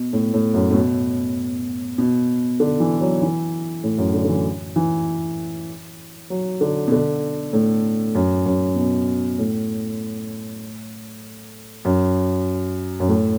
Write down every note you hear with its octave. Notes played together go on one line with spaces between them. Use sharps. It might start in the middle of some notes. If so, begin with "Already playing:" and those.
Already playing: B2
A2
A2
F#2
A2
B2
B2
D3
E3
F#3
E3
A2
F#2
D3
D3
E3
E3
F#3
D3
B2
D3
A2
F#2
F#2
B2
A2
F#2
F#2
A2